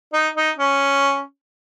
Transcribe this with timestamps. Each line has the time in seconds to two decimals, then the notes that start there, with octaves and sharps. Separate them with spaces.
0.13 D#4
0.36 D#4
0.58 C#4